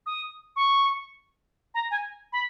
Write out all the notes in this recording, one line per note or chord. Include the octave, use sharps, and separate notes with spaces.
D#6
C#6
A#5
G#5
B5